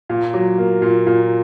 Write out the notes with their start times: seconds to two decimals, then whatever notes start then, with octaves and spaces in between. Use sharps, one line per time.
0.09 A#2
0.34 F#3
0.58 A#3
0.82 A#2
1.07 A#2